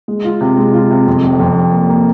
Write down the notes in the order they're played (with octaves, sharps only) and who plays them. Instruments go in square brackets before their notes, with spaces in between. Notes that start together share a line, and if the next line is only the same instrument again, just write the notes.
[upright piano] G#3
F4
C3
G#3
F4
C3
F2
F1
F2
F1
A#3
A#3